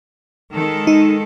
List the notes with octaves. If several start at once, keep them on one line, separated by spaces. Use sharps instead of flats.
D#3 G#3 A4
D#4